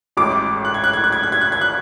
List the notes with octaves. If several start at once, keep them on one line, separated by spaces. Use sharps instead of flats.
A1 A2 G#3 D6
F#6
G#6
F#6
G#6
F#6
G#6
F#6
G#6
F#6
G#6
F#6